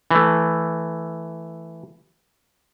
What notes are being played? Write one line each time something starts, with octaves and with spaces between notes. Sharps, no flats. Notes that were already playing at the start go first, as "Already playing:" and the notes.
E3 A3